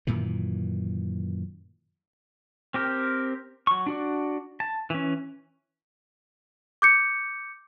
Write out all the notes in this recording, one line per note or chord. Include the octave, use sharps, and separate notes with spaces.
F#2 A#2 D#3 E3
C4 G4 A#4
F#3 C#6
D4 F#4 D5
A5
E3 C#4
D6 G6 C#7